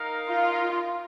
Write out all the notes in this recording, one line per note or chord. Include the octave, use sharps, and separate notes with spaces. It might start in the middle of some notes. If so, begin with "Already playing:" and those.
Already playing: D#4 A#4 F5
F4